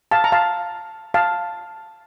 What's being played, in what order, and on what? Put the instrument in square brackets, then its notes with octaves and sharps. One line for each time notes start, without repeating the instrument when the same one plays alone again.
[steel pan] F5 A5
A#5
F5 A5
F5 A5